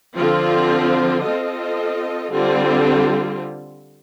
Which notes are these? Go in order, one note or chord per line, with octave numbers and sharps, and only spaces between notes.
D3 F3 C4 F4
C4 F4 A4 D#5
D3 G3 C4 F4